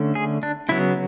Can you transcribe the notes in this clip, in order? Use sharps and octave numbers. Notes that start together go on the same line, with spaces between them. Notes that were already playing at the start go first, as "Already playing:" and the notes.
Already playing: D3 A3 C#4
G#4
D4
C#3 F#3 B3 E4